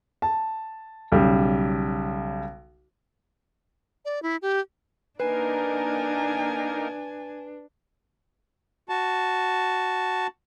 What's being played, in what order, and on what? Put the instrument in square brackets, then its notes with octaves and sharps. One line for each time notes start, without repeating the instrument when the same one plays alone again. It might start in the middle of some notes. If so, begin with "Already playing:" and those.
[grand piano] A5
B1 C#3 G3
[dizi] D5
E4
G4
[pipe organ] A#3 D#4 A#4 [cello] D4 [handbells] B4 [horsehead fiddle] G#5
[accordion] F#4 A5